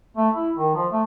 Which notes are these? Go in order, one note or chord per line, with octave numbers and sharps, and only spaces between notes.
A3
E4
D#3
F3
A3